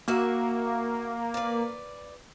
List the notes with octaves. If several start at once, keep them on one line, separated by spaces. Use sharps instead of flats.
A#3 F#4 E5 F#5
B4 D5